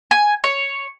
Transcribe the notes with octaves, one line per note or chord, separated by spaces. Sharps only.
G#5
C#5